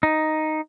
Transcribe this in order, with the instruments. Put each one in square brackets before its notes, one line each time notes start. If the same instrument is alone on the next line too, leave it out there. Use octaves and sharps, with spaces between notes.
[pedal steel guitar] D#4